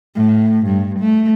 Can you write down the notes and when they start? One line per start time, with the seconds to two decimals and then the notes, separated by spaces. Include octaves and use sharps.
0.15 A2
0.66 G2
0.99 A3